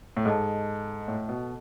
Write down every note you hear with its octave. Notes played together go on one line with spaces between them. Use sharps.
A2
G#2 A4 D#5 A5
A2
B2